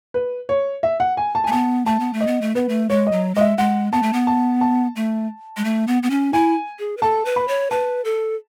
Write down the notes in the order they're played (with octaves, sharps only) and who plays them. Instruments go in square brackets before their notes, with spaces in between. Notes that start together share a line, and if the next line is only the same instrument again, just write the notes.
[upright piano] B4
C#5
E5
F#5
G#5
A5
G#5
[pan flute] A3
[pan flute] B3 [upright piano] A5
[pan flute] A3 [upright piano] A5
[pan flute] B3
A3
[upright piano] D#5
[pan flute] B3
A3
[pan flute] B3 [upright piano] B4
[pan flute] A3
[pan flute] G#3 [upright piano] C#5
[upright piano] D#5
[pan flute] F#3
[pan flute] G#3 [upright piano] D#5
[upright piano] E5
[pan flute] G#3 [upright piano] F#5
[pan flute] B3 [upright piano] A5
[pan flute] A3
B3
[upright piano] A5
A5
[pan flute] A3
G#3
A3
B3
B3
C#4
[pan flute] E4 [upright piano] G#5
[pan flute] G#4
B4
[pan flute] A4 [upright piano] A5
[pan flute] B4
[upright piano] B5
[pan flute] C#5
[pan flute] B4 [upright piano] A5
[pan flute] A4